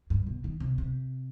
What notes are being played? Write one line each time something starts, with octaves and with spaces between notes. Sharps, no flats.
G2
B2
D#3
C3
C3